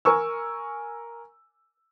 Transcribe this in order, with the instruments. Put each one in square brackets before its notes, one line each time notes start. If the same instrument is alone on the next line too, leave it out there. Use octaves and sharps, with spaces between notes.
[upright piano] A#4 G#5 C#6 E6